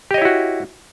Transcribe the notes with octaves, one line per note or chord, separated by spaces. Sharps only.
E4 F#4 G4 C#5 D#5